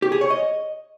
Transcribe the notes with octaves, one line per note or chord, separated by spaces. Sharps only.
G4
G#4
C#5
D#5